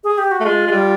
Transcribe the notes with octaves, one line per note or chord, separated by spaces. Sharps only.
G#4
G4
F#4
A3
G#3 F4
G#3
G3